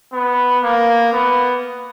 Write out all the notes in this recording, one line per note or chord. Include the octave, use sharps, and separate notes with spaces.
B3
A#3
B3